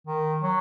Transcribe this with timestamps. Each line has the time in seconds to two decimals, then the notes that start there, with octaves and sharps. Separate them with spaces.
0.07 D#3
0.42 F#3